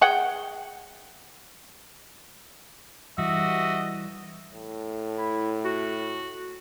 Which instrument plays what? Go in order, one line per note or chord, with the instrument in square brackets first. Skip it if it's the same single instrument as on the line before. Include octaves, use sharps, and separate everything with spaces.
[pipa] G#4 F#5 G5
[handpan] E3 G3 [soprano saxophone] F#4 [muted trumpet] D#5 [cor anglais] E5
[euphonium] A2
[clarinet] E4
F#4